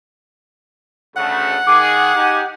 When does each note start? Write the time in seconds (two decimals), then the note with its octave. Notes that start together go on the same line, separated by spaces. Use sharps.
1.17 D2 C#3 A3 F#5
1.67 D#3 G#4 D6
2.15 D#4 G4 G#5